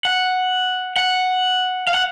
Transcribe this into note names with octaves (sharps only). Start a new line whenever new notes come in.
F#5
F#5
F5
F#5